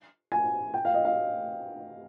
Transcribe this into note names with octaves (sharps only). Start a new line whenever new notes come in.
G#5
G5
F5
D#5
F5